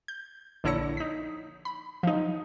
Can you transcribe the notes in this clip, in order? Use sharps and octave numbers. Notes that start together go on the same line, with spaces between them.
G6
A#1 D3 E4 C#5 A#6 C#7
D#4 B6
B5
F3 D#4